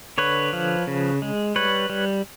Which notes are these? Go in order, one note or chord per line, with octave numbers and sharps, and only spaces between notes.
D3 B4 C#5
F3
C#3
G#3
G3 B4 C#5
G3